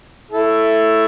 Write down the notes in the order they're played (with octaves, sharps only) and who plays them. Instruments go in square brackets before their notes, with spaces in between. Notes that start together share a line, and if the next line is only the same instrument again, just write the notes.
[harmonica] E4 A4